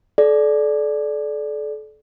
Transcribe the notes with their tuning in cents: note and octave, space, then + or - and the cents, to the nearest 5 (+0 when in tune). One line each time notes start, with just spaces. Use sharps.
A4 -35 D5 +0